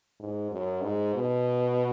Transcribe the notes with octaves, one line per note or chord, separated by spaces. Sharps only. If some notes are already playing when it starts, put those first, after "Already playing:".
G#2
F#2
G#2
B2